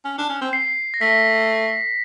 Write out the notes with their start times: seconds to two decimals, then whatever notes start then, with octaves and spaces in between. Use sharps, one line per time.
0.05 C#4
0.18 D4
0.29 C#4
0.41 C4
0.53 C7
0.94 A#6
1.01 A3 B6